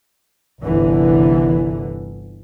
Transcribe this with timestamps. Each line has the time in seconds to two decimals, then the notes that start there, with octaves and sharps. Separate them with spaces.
0.63 G1 C2 D3 E3